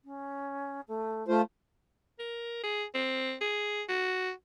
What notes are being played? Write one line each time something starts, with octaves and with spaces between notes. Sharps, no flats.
C#4
A3
A3 F4 C5
A#4
G#4
C4
G#4
F#4